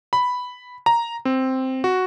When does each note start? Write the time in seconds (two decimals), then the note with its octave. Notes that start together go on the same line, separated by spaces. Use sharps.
0.13 B5
0.86 A#5
1.25 C4
1.84 F#4